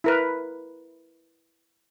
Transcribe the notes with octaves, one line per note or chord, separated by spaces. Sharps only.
E4 A#4 B4